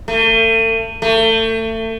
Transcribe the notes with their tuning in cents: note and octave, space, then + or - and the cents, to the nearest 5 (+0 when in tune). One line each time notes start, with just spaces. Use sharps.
A3 +40
A3 +30